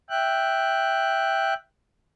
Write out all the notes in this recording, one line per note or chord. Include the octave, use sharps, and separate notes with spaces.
E5 G5 F#6